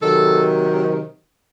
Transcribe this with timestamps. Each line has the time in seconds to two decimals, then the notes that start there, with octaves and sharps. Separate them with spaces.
0.02 C3 D#3 F#3 A4